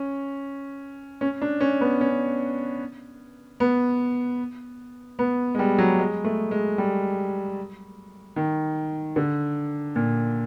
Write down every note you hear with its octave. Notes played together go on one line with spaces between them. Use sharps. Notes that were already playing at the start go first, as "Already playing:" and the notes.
Already playing: C#4
C#4
D4
C#4
B3
C#4
B3
B3
G#3
G3
F#3
G#3
A3
G#3
G3
D#3
D3
A#2